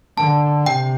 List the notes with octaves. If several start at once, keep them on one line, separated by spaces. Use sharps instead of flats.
D3 A5
C3 G5